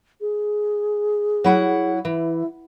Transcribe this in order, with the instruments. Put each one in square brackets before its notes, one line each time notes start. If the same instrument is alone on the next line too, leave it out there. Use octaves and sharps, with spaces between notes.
[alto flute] G#4
[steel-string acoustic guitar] F#3 E4 F#5
[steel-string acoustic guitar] E3 [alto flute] E4